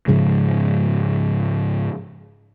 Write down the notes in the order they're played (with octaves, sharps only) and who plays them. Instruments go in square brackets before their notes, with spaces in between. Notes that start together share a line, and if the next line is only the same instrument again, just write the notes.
[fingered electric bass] G#2 C#3 F3 G#3